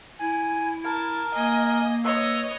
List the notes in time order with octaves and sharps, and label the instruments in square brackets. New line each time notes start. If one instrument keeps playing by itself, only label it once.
[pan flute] E4 [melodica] G#5
[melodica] A#4 [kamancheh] A5
[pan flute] A#3 [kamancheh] D#5 [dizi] G#5
[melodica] B4 [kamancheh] C#5 D#5 [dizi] E6